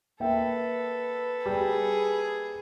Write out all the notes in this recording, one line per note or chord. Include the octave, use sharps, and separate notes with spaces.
A#3 A4 B4 E5 G5
G3 G#4